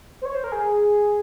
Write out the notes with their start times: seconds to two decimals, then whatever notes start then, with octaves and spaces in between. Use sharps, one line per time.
0.22 C5
0.25 C#5
0.35 C5
0.44 A#4
0.52 G#4